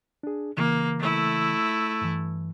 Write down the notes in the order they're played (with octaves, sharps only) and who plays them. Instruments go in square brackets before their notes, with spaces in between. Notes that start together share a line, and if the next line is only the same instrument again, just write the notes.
[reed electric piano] D4 G#4
[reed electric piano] C#3 E3 [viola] A#3
[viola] A3 E4
[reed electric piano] G2 E3